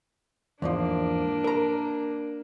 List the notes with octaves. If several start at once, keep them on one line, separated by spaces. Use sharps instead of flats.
E2 G#2 F3 A#3 D4
A#4 A#5